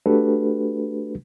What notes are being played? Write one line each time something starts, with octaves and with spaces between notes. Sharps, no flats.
A3 D4 F#4 G4 A4 B4